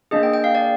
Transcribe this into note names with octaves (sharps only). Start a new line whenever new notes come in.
A#3 D4 G#4 D#5
G5
G5
F5
D5